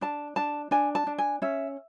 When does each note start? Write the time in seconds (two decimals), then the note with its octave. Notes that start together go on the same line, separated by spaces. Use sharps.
0.01 D4 A5
0.36 D4 A5
0.71 D4 G#5
0.95 A5
1.07 D4
1.18 G#5
1.42 C#4 E5